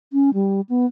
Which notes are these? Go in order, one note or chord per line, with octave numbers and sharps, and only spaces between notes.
C#4
G3
B3